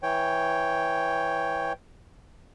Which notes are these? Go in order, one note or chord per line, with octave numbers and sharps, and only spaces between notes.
E3 C#5 G5